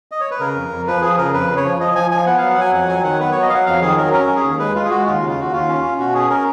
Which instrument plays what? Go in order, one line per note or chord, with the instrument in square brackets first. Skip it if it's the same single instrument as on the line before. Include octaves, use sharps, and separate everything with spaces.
[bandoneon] D#5
C#5
B4
C#3 A#4
F2
F2
F3 B4
F3 G#4
C#3 A#4
F2 B4
C#3
C#5
F3
F3 D#5
F3 G#5
F3 G#5
B3 F#5
F#3 F5
F#5
F#3 G#5
F2 F#5
F#3 G#5
D#3 F#5
B3 B4
F#3 C#5
D#5
F#3 F5 F#5
F2 F5
D#3 G#4
F#3 A#4
C#4 A#4
C#4
G#4
D#2
G#3 B4
G#3 F4
G#4
G#3 F#4
D#2 F4
C#3
F4
D#2 F#4
D#2 F4
C#4
C#4
B2 F#4
C#4 G#4
C#4 A#4